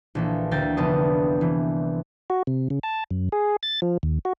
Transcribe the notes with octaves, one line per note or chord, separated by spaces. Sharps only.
A#1 E3 A4
D2 A#4 G5 A6
F1 C2 B3 D4 A5 D#6
C3 E3
F#4
C3
C#3
A5
F#2
G#4
A6
F3
D#2
F#4